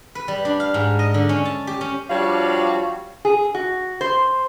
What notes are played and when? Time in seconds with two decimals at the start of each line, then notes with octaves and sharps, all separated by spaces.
0.15 B4
0.28 G3
0.45 D4
0.60 F5
0.74 G#2
0.99 D#5
1.14 D3
1.29 C#4
1.45 A5
1.67 G4
1.81 C#4
2.10 F3 G3 D4 F#4 C#5 F5
3.25 G#4
3.54 F#4
4.01 C5